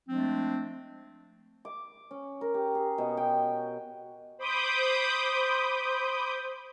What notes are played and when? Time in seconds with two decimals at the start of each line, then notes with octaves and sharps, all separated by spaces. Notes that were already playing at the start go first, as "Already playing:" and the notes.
0.08 F3 G#3 A3 C4 D4
1.65 D6
2.11 C#4
2.41 A#4
2.54 G4
2.75 G#4
2.98 B2
3.17 G5
4.38 C5 B5 D6 D#6 G6